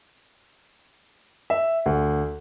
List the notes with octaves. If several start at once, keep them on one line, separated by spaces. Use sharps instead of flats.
E5
D2